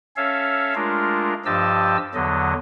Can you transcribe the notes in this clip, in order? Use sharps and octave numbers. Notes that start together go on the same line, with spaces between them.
C#4 A4 C#5 E5 F5
G#3 A3 D4 F4 A#4
G2 F3 G4 D#5 A5 E6
E2 D3 F#3 D#5